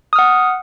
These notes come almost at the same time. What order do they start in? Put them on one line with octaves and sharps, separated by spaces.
D#6 F6 F#5